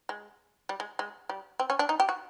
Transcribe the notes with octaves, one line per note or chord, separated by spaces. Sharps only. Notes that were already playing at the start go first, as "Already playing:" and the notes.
G#3
G3
G#3
G#3
G3
C4
C#4
D4
D#4
G4
F#4